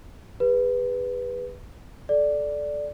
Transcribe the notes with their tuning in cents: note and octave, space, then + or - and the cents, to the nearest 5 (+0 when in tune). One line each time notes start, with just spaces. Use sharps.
G#4 -40 B4 +0
A4 -20 D5 +0